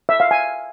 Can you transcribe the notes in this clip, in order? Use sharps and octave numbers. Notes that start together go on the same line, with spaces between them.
E5
F5
G#5